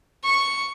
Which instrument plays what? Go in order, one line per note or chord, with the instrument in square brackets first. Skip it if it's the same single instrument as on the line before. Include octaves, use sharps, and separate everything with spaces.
[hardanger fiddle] C#6